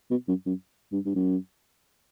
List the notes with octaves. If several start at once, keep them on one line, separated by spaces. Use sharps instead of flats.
B2
F#2
F#2
G2
G2
F#2